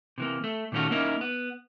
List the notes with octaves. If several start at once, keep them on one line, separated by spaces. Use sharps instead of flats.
C3 E3 A#3
A3
A#2 D#3 A3 C#4 F4 F#4
A#3 C#4 D#4 E4 A#4
B3